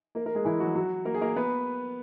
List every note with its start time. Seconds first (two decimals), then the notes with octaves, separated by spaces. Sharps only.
0.15 A#3 A#4
0.26 A#3 A#4
0.35 G#3 G#4
0.45 E3 E4
0.60 F#3 F#4
0.75 F#3 F#4
1.05 A#3 A#4
1.14 G#4
1.21 A#3 A#4
1.36 B3 B4